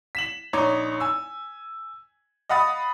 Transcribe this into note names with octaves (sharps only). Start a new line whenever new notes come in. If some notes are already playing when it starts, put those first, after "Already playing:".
B6 E7 F#7
A#1 D#4 C#5 D6
G#5 E6
D#5 F5 F#5 B5 D#6 A6